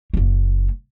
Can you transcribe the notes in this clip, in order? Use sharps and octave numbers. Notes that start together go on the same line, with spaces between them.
F#1 A#3